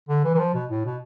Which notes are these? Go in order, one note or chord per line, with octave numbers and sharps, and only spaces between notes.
D3
E3
E3
F3
B2
A2
B2